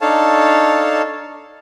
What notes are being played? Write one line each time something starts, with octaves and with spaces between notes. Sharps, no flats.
D4 D#4 A4 C#5 F5 A5